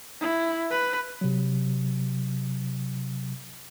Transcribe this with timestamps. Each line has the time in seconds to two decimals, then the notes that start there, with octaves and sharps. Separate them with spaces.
0.21 E4
0.71 B4
1.21 C3 F#3